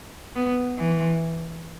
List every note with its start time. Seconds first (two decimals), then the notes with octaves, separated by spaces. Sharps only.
0.36 B3
0.78 E3